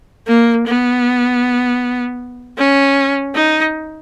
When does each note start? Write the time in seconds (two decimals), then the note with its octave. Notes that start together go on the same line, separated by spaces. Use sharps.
0.27 A#3
0.66 B3
2.58 C#4
3.35 D#4